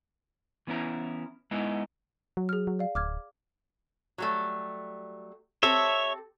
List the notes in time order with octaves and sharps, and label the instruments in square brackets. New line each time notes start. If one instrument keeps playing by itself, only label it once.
[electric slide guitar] E3 B3 C#4 E4 A#5
G#3 B3 D#4 E4
[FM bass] F#3
[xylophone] G#4 F6
[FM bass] F#3
[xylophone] D5 F5
[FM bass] D1 [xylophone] D6 F6 G#6
[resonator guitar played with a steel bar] F#3 G3 A3
[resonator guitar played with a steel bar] C4 G4 A4 [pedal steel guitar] C#5 E5